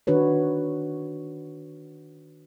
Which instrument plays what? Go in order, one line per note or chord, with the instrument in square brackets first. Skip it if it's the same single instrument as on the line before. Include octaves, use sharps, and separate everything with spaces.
[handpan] D#3 D4 F#4 B4 C#5